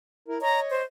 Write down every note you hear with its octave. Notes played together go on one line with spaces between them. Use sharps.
E4 A#4
C#5 D#5 A#5
C5